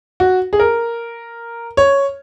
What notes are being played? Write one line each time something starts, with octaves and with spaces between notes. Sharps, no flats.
F#4
G#4
A#4
C#5